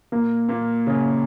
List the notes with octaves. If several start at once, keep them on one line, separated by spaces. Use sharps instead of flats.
A#2 A#3
A#2 A#3
C#3 C#4